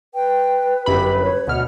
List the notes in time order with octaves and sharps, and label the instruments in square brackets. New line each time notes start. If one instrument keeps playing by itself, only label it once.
[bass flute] B4 [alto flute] G5
[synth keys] G1 F#2 B5 [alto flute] G4
[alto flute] C#5
[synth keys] D2 B2 F6 [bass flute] F#5